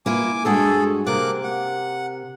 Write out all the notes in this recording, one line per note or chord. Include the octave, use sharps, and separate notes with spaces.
A#3 E4 F4 G#5 D6
G2 G#3 F#4 G#4 A4
C3 A#3 A#4 D6 F#6
F#5